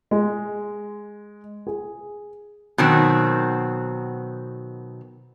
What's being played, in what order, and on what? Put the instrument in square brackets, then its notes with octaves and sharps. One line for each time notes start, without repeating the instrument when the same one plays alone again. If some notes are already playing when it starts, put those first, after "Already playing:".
[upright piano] G#3
G#4
[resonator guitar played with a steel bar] B2 D#3 F#3 C4